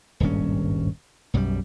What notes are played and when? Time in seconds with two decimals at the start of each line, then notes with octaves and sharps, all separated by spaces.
0.20 D#1 G#1 G2 C#4
1.34 B1 F#2 F3 G3